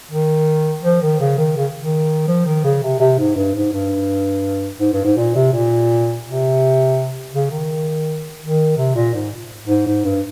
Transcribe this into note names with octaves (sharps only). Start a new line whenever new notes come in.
D#3
F3
D#3
C#3
D#3
C#3
D#3
F3
D#3
C#3
C3
C3
G#2
G2
G#2
G2
G#2
G2
G#2
A#2
C3
A#2
C3
C#3
D#3
D#3
C3
A#2
G#2
G#2
G#2
G2